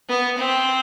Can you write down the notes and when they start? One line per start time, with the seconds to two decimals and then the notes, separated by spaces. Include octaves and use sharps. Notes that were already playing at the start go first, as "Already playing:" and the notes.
0.09 B3
0.38 C4